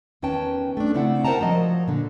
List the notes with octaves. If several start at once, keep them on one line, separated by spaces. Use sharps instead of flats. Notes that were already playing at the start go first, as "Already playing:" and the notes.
E2 D#3 C#4 B4 G5 A5
A3 D4
C#3 A3 C4 E4 D5 F#5
A#4 C5 F#5 G5 A5 A#5
F3 F#3 D#5
A#2 D3